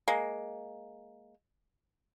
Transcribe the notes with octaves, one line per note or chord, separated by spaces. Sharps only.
G#3 A#3